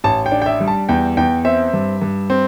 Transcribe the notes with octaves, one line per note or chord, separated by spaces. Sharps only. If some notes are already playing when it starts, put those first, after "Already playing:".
A1 A5
G5
D4
G5
E5
G3
A5
E2 G5
E2 G5
C4 E5
G2
G2
C4